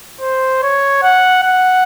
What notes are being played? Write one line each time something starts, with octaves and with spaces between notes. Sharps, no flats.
C5
C#5
F#5
F#5